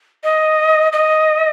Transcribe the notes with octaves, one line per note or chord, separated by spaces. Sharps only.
D#5
D#5